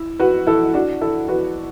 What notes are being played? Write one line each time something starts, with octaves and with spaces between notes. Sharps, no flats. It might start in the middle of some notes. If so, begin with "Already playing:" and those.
Already playing: E4
F#4 B4
E4 A4
D4 F#4
E4 A4
F#4 B4